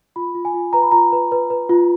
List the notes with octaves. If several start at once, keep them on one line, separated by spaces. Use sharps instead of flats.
F4 B5
F4
G#5
F4
B4 A#5
B5
F4 A#5
B4
B4
B4
F4